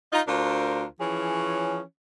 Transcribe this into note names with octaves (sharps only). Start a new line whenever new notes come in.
D#4 F4
D2 D4 F4 A#4 C5
E3 F3 C#4 G#4 C#5